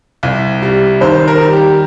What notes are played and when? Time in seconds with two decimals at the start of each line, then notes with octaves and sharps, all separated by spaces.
0.23 C2
0.62 G3
1.01 D#3 C5
1.28 A#4
1.40 G3
1.53 G4